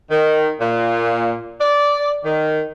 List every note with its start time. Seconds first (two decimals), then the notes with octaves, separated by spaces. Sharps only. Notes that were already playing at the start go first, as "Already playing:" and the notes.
0.11 D#3
0.61 A#2
1.61 D5
2.24 D#3